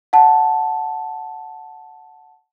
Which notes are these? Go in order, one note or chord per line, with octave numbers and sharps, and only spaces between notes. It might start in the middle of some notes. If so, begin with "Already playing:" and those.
F#5 A5